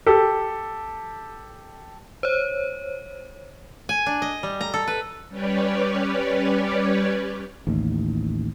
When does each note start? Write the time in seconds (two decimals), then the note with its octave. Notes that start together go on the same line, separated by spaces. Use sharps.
0.06 G4 A4
2.23 C5 C#5
3.89 G#5
4.06 D4
4.22 D#5
4.43 G3
4.61 A#5
4.74 A4
4.87 B4
5.29 G3 C#4 G4 B4 C#5 D5
7.67 A1 D#2